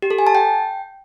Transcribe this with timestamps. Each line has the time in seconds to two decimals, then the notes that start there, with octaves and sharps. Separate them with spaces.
0.02 G4
0.11 A4
0.19 G#5
0.27 A5
0.35 G5